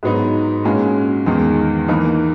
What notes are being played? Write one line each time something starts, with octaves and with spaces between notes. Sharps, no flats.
G#2 F#3 B3 D#4
A#2 G#3 C#4 F#4
E2 D#3 G#3
E3 A#3 D#4